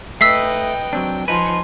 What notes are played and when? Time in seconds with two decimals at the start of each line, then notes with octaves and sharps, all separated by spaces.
0.21 A3 D#4 B4 D#5 G5 E6 B6 C7
0.93 F#3 C4 D4
1.28 F3 D#4 B4 G#5 C6